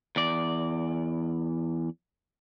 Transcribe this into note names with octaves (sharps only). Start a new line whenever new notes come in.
E2 D5